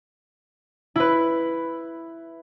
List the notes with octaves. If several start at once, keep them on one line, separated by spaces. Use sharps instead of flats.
E4 B4